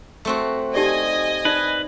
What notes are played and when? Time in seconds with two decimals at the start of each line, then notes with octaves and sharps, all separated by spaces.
0.25 A3 C4 F#4
0.75 D#4 G4 D5 D#5 G#5
1.45 D#4 B4 D5